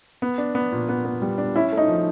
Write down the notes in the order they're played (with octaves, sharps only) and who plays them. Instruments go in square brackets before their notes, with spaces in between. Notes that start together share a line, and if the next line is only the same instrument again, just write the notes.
[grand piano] B3
D4
B3
A#2
B3
B3
G3
D4
[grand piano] C#4 [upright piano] E4
[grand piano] A3
[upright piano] D#4
[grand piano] F3